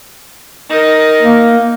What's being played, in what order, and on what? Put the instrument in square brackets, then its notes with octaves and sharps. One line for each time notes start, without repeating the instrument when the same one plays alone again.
[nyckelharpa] D#4 A#4
[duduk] A#3